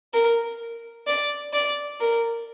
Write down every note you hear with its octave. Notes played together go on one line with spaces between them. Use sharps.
A#4
D5
D5
A#4